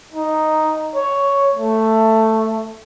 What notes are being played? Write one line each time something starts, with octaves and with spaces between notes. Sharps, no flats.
D#4
C#5
A3